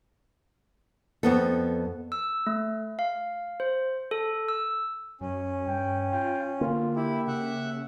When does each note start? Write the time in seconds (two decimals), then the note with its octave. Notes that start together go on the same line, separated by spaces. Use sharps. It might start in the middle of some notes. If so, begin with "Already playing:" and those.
1.23 F2 B3 A4
2.12 E6
2.47 A3
2.99 F5
3.60 C5
4.11 A4
4.48 E6
5.21 F#2 C#4
5.67 G2 G5
6.12 F4 G5
6.61 D3 A#3 F4
6.96 E4 G4
7.27 C#3 E5 F#5